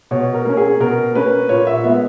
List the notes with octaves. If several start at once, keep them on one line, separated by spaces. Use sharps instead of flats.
B2 C#5
A#4
A#3 C#4
G#4
B2 A#4
A#3 C#4 B4
A#2 C#5
E5
G#3 B3 E5